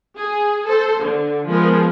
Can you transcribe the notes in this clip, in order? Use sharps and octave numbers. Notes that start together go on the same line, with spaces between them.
G#4
A4 C5
D3
F3 G#3 B3 A#4